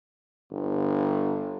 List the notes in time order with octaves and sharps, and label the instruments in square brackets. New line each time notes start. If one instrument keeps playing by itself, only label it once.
[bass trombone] G1